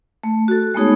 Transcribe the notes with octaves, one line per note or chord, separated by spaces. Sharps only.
A3
F#4 A4
G#3 A3 B3 D#4 G#4 C#5